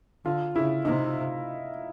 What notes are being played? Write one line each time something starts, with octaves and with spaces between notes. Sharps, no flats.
D3 F4
C#3 E4
C3 D#4